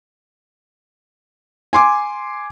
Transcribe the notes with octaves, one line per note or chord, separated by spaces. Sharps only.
G#5 C6 D6